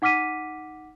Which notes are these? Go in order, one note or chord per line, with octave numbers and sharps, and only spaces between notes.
D#4 F#5 D6 F6 B6 D#7